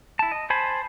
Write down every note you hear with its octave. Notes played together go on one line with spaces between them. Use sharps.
E4 A5
D#5
C5 G#5 A5 B5